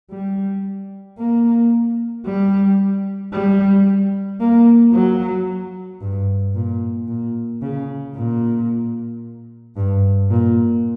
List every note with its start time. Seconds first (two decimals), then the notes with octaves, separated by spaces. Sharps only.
0.11 G3
1.18 A#3
2.26 G3
3.33 G3
4.40 A#3
4.94 F#3
6.01 G2
6.55 A#2
7.08 A#2
7.62 C#3
8.16 A#2
9.76 G2
10.30 A#2